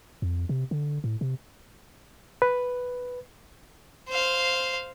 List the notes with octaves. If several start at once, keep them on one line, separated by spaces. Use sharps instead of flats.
F2
C3
D3
A2
C3
B4
C5 F5